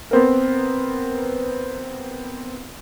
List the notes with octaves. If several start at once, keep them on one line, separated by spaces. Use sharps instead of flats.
B3 C4 A#4